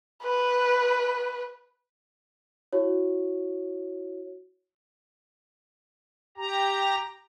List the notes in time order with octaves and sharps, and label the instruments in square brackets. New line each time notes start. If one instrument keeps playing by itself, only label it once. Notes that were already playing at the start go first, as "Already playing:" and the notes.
[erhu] B4
[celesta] E4 F#4 C#5
[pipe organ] G4 A#5